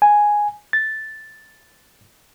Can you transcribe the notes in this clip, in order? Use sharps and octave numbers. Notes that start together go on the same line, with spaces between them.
G#5
A6